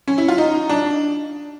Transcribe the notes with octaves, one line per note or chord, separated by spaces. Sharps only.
C#4
E4
F4
D#4
D4